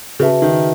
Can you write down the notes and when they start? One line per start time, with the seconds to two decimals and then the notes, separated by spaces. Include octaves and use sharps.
0.20 C#3 F#4 B4 E5 A5
0.42 D#3